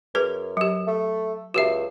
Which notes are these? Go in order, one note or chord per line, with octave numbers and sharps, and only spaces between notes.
F#2 G#4 B4
F#3 G4
A3
C#2 F#4 G4 E5